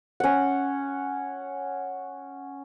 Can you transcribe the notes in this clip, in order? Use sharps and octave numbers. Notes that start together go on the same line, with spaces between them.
C#4 F#5